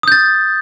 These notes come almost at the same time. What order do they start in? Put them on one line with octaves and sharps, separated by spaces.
D#6 G6 A6